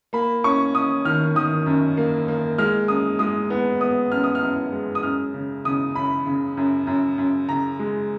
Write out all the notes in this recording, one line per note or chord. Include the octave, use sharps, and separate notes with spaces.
A#3 B5
C#4 C#6
C#4 D#6
D#3 F6
D#3 D#6
F#2
A#3
A#3
G#3 F6
F#2 D#6
G#3 D#6
B3
B3 D#6
F#2 F6
D#6
F6
F#2
G#3
D#6
F#2 F6
C#3
C#3 D#6
F#2 B5
C#3
F#2
F#2
F#2
C#3 A#5
G#3